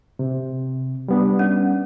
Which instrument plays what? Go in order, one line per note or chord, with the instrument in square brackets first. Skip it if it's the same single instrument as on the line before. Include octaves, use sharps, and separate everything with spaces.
[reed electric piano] C3
G3 B3 D4
[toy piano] C#4